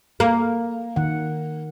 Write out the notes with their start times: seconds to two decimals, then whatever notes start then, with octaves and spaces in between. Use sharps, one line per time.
0.20 A#3
0.96 D#3 F#5